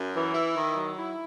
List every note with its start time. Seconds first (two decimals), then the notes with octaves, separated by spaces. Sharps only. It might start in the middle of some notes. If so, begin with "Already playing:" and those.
Already playing: F#2
0.13 E3
0.33 E4
0.55 D#3
0.75 F#3
0.97 E4